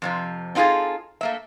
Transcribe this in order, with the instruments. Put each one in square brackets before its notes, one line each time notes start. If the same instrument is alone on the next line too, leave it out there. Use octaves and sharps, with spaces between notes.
[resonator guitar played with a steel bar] F2 C3 F3
C4 D#4 F4 F#4 G#4 A4
A3 A#3 E5